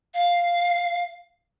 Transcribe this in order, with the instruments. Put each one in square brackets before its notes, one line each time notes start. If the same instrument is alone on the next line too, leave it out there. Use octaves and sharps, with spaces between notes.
[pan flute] F5